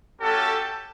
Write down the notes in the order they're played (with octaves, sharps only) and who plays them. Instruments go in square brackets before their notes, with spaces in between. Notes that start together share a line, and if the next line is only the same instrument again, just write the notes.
[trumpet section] A3 C#4 F#4 G4 A4